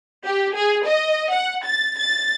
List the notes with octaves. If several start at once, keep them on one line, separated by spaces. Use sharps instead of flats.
G4
G#4
D#5
F#5
A6
A6